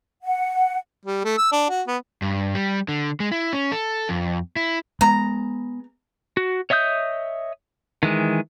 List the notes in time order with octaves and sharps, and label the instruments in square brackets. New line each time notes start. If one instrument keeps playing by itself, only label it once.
[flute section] F#5
[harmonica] G3
A3
E6
D4
F#4
B3
[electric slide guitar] G2
G3
D3
G#3
E4
C#4
A4
F2
E4
[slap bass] G#3 B3 [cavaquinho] A#5
[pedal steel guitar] F#4
C#5 D#5 E5 D#6 G6
D#3 E3 G#3